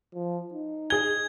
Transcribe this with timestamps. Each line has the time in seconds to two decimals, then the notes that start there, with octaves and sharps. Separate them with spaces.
0.14 F3
0.53 D#4
0.90 G#4 G#6 G7